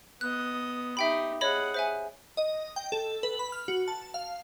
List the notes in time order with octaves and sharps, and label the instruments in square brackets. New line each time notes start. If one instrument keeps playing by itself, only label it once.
[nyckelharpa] B3 D#5 [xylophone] F#6
[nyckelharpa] D#4 G4 [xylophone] E5 G5 B5
[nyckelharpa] G#4 F#5 [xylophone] C#5 D#5 B5
[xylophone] C5 E5 G#5
[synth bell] D#5
G5
A4
B4
B5
F6
F#4
A5
F5